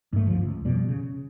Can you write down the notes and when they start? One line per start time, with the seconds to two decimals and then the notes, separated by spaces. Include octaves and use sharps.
0.13 G#2 A3
0.26 G1 D2 F3
0.43 C#2
0.65 F2 B2 G3
0.88 C#3